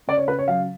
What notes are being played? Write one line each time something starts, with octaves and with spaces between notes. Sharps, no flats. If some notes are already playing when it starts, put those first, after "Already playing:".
C#3 D5
C#5
C#3 B4
C#5
F#3 F5